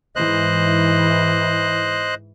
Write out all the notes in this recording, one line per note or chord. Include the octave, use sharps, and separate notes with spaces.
G#2 E3 C5 D#5 F#6